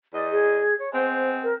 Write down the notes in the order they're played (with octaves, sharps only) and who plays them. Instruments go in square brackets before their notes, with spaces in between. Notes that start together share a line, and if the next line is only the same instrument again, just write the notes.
[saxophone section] E2 D#5 [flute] D5
[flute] G#4
C#5
[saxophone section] G#3 B3 C4 [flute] C5
[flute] A#4